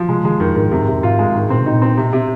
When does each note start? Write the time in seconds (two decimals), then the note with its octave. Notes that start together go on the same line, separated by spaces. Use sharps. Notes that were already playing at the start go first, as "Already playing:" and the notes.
Already playing: F3
0.08 C3 G#3
0.24 D#3 G#3
0.40 F2 D#3
0.56 G#2 D#3
0.71 F2 C3
0.81 G#2
0.87 C3
0.92 F2
1.03 G#2 F4
1.19 G#3
1.35 G#2 D#3
1.50 A#2 C4
1.61 C3
1.66 D#4
1.72 A#2
1.82 C4
1.97 C3
2.13 C3